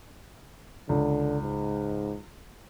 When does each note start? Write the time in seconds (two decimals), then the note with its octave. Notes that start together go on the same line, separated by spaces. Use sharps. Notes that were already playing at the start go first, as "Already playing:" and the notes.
0.89 C#2 D3
1.43 G#2